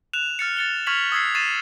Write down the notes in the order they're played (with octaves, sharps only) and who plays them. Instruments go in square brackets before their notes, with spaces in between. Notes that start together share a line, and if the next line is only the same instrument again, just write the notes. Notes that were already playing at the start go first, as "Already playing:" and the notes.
[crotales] F#6 E7 F7
F6 A6 C#7
A6 C#7 G7
C#6 F6 G#6 B6 F7 F#7
D#6 E6 G#6 B6 C7
C#6 A6 C7 D#7 E7